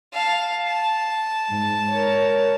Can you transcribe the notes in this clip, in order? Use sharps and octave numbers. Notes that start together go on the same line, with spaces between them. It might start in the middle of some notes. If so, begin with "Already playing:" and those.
F5 A5
A5
G#2
A#4 C#5